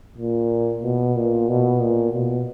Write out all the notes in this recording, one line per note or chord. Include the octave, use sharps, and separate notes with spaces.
A#2
B2
A#2
B2
A#2
B2